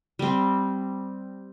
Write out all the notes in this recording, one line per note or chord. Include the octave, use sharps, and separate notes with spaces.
G3 C4